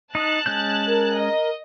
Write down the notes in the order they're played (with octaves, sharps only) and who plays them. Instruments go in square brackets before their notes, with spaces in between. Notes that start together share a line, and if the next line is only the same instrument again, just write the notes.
[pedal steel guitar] D#4 D#6 [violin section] A5 F#6
[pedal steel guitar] G#3 C#4 G6
[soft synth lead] A#4
[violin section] D#5